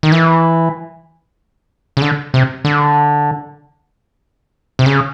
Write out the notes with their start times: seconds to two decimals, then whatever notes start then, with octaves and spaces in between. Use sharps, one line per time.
0.03 D#3
0.12 E3
1.97 C#3
2.02 D3
2.34 C3
2.65 D3
4.79 C3
4.86 C#3